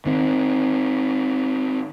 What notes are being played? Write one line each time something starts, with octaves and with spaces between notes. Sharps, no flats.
D#3 C4